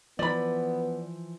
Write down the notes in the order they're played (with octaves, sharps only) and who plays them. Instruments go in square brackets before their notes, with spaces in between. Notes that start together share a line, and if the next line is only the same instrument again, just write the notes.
[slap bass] E3 F3 [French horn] B3 [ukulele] D5 B5